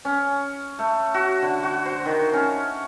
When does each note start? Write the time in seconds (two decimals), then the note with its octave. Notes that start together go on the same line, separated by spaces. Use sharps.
0.05 C#4
0.79 A3
1.14 F#4
1.42 D3
1.63 F#4
1.86 C5
2.05 D#3
2.33 C#4